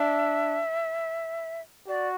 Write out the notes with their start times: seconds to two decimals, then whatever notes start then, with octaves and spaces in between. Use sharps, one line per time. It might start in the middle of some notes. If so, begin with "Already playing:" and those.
Already playing: D4 E5
1.88 F#4 D5